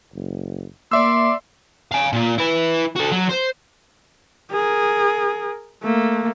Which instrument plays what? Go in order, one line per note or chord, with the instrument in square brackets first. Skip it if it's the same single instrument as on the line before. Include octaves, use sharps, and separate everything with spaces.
[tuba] F#1
[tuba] A#3 [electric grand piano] D5 E5 E6 [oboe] C6 [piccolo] D6
[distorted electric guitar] F5 G#5
A#2 F4
E4 B4
F#4 A4
F#3
C5
[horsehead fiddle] G#4 A#4
A3 A#3